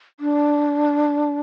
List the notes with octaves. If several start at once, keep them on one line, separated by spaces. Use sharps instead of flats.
D4